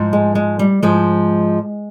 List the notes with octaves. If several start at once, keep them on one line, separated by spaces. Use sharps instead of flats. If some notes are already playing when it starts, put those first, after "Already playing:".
Already playing: G#2 F3
G#3
G#3
G3
G#2 F3 G#3